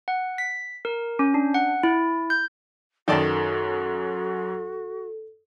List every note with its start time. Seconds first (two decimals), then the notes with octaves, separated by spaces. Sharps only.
0.08 F#5
0.38 B6
0.85 A#4
1.19 C#4
1.34 D4
1.54 F#5
1.83 E4
2.30 G6
3.08 F#2 D#3 F#3 F#4 A4 D5 A5